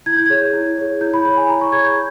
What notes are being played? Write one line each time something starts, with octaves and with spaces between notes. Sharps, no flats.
E4 G#6
G6
G#4 C#5 G#6
E4
G#4 C#5
E4 G6
B5
G#4 C#5 B5
G#5
E4 A#5
C#6
G#4 C#5 G#6
G6